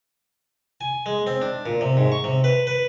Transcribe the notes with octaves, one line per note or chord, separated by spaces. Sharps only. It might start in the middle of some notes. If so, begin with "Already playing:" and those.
G#5
G#3
C4
D4
A#2
C3
G#2
C#6
C3
B4
B4